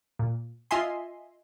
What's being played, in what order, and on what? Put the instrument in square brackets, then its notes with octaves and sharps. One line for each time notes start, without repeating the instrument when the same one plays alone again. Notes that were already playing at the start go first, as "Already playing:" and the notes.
[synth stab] A#2
F4 D#5 E5 G#5 C6